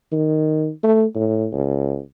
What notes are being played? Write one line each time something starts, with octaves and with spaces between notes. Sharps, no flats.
D#3
A3
A2
C#2